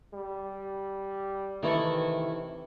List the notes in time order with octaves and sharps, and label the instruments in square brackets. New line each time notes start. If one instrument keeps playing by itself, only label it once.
[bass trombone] G3
[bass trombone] C3 [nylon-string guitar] D#3 E3 [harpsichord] A3 E4 A4